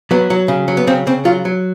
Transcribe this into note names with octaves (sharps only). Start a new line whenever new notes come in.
F#3 B3
F#3
C#3
F#3
B3
C#3 C4
C#3 C4
F#3 F4
F#3